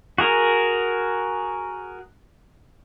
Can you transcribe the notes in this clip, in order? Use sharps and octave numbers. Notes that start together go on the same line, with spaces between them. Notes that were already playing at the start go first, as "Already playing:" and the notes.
F#4 G#4 A#4